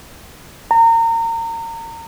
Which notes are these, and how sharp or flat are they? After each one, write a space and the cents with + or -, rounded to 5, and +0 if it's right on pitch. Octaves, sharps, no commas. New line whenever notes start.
A#5 -30